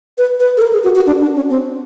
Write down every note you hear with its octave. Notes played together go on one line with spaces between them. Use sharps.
B4
B4
A4
A#4
G#4
F#4
F#4
D4
D4
C#4
C4